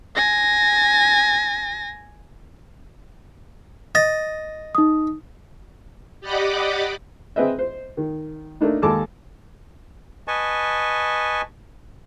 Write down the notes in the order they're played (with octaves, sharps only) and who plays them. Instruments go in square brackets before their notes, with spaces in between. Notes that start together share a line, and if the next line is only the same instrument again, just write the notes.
[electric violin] G#5 A#6
[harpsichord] D#5 [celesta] A6
[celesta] D#4 D#6
[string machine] G4 D5 D#5 F#5 B5 D6
[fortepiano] C4 G#4 B4 D#5 E5
C5
D#3
A3 A#3 D4 D#4
D#2 G#3 A4 A5 D6
[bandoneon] B4 D#5 G#5 A5 C#6